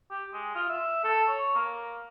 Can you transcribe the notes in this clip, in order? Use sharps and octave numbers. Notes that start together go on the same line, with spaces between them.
G4
G#3
F4
E5
A4
C#5
A#3